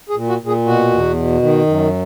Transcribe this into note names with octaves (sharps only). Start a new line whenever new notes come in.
G#4
A#2
F#4
A#2
G#4
B2 F#4
E2
B2
D#3
F#2